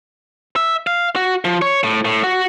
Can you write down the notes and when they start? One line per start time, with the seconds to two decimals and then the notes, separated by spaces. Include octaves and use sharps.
0.56 E5
0.87 F5
1.16 F#4
1.45 F3
1.62 C#5
1.84 A2
2.05 A2
2.24 F#4